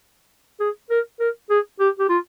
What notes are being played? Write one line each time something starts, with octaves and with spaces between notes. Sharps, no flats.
G#4
A#4
A#4
G#4
G4
G4
F4